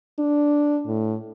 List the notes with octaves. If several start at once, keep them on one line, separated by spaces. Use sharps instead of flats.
D4
A2